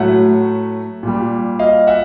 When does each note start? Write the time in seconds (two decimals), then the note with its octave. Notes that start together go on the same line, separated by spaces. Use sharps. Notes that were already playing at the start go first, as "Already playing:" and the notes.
Already playing: A2 F#3 A3 E5 F#5
1.03 A#2 G3
1.59 D#5 F5
1.87 E5 F#5